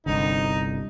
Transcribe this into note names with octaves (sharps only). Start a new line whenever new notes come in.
G1 C2 D3 D#4